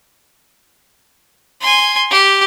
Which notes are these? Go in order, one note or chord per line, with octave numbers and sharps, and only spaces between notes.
G#5 C6
G4